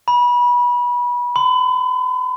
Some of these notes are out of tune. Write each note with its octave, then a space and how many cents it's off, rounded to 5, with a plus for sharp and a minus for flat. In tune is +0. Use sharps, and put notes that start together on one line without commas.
B5 -25
B5 +45